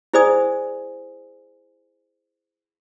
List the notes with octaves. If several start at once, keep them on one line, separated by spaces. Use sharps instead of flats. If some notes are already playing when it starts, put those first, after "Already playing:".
E4 G#4 C5 D5 G#5 D#6